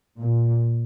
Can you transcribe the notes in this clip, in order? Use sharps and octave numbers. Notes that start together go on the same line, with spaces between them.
A#2